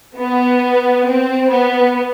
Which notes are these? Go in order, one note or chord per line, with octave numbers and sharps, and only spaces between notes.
B3
C4
B3